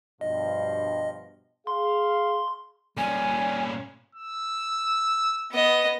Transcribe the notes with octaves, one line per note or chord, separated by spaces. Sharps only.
G2 B2 F3 D#5
G#4 F5 C6
A#2 G3 C#4 G#5
E6
B3 D#5